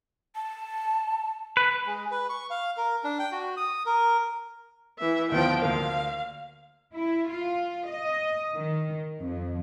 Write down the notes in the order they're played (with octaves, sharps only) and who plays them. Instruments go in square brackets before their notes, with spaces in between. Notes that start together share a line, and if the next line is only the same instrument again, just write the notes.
[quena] A5
[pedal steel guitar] B4
[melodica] G#3
B4
C#6
F5
A#4
D4
G5
F#4
D#6
A#4
[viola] E3 E5
[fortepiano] D2 D#3 B3 [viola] F3 G5
[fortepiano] D2 A#3 [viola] F5
[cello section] E4
F4
D#5
D#3
F2